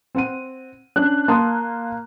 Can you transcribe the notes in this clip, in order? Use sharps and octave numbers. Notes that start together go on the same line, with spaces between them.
C4 F#5 D#7
C#4 D4 F#6
A#3 A5 C6 D#6